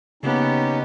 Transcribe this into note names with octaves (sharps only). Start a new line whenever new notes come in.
C#3 A#3 B3 C#4 D#4 G4